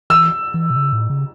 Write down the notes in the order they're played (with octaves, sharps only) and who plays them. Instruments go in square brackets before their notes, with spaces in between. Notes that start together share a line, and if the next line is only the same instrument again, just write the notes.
[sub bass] E3 [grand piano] E6
[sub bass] E3
B2
C#3
A2
C#3